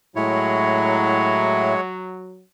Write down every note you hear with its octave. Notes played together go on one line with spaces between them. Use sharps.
A2 F#3 G#3 E4 C#5